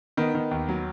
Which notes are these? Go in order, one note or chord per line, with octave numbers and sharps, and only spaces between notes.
D#3 B3
D#3
D#2
F#3